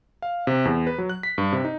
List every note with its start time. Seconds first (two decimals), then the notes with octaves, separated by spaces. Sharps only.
0.22 F5
0.47 C3
0.65 E2
0.87 B4
0.98 F#3
1.10 F#6
1.23 B6
1.38 G2
1.53 C3
1.65 D#4